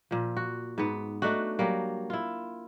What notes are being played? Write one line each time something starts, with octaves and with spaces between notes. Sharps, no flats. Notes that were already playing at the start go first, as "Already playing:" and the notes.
A#2 F3
F#4
G#2 B3
A3 D4 D#4 F#4
F#3 G3 A#3
E4 F4